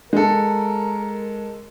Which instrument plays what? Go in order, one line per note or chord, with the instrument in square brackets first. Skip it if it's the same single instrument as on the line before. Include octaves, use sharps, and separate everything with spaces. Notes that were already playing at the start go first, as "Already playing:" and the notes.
[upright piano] G#3 A4 [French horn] A#4